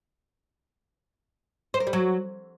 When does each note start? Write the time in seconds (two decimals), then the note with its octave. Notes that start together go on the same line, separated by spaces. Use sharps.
1.74 C5
1.80 A#4
1.87 G3
1.93 F#3